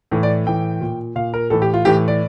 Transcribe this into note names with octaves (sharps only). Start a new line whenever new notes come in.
A2 E3
D5
A2 E3 G5
A#2
A#2 F5
A#4
A2 E3 A4
G4
F4
A2 E3 G4
D5